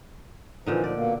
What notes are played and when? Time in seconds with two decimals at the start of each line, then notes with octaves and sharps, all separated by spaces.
0.66 A#2 D3 E3 F3 D#4
0.84 D2 F3 D5
0.95 B2 A#3